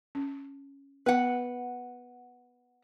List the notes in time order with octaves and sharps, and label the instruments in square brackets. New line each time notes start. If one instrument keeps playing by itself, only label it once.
[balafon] C#4
[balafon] B3 [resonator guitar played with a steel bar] B4 F#5